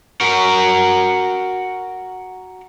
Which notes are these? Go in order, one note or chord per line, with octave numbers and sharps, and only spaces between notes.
F#4 A#4